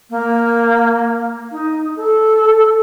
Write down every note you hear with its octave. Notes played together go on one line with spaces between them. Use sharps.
A#3
D#4
A4